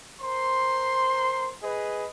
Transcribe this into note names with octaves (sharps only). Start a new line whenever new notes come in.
A#4 C5 C6
G#4 B4 D#5